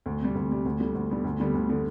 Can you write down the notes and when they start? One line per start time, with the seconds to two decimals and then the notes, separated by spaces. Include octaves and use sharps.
0.06 D2
0.21 C3 G3
0.35 D2
0.50 C3 G3
0.66 D2
0.80 D3 G3 B3
0.95 D2
1.10 D3 G3 B3
1.24 D2
1.40 D3 G3 B3
1.54 D2
1.69 D3 G3 B3